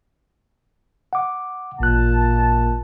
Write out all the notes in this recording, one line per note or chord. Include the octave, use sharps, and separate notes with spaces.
F#5 D6
A1 A#2 A#3 A5 F#6